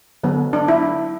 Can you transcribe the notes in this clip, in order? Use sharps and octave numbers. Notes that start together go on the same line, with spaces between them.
D3 F#3 B3
D4
E4